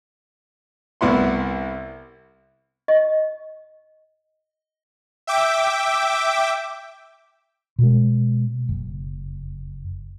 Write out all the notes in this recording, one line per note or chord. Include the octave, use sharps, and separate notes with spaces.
C2 B3 E4 C6
D#5
E5 G5 D6
B2 G#3
F#1